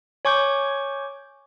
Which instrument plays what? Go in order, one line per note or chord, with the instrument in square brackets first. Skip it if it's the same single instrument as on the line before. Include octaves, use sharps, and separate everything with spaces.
[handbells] C#5 G#5 C#6 D6 G6